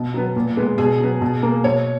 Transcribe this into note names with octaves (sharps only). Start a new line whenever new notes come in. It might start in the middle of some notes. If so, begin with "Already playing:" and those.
Already playing: B2
F#3 B3
A#2
G#3 B3
B2 G#4
F#3 B3
B2
A#3
B2 C#5